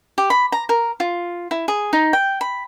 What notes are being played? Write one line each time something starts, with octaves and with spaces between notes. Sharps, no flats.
G4
B5
A#5
A#4
F4
E4
G#4
D#4
G5
B5